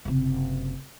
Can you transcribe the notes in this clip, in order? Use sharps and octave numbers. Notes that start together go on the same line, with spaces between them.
F#1 C3